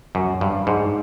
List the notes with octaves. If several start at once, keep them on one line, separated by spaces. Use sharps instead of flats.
F#2
G2
G#2